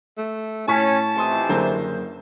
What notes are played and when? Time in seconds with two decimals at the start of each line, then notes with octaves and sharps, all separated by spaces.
0.18 A3
0.68 A2 C#4 A5 C#6 B6
1.16 F2 C3 E3 G#5 C6 D#6
1.49 F#1 D3 C5 A#5